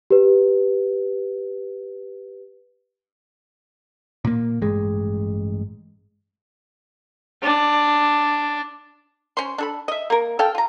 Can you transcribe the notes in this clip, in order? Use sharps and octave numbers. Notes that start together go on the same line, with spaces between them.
G4 B4
A#2 A#3
A1 G2 G#3
D4
C#4 C5 C6
D4 A4 B5
D#5 E5
A#3 A#4
A4 F5 G5
F4 A#5